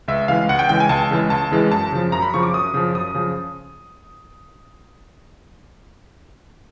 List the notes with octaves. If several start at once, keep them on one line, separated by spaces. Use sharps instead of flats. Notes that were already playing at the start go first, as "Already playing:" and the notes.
C#2 E5
C#3 E3 G#3 F5
C#2 F#5
G5
C#3 E3 G#3 G5
G#5
C#2 A5
C#3 E3 G#3
C#2 A5
C#3 E3 G#3
F#2 A5
C#3 F3
F#2 A#5
B5
C#3 F3 C#6
D6
F#2 D#6
C#3 F3
F#2 D#6
C#3 F3